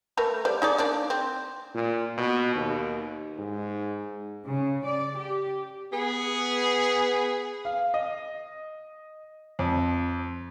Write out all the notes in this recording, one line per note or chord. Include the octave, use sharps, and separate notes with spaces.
A3 A#4 B4
G3 C5 D5
D#4 G#4 D5
A#3 D4 D5
C4
A#2
B2
D#2
G#2
C#3
D5
G4
B3 G#4
F5
D#5
F2